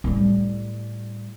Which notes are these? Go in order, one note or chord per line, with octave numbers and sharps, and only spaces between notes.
A2 G3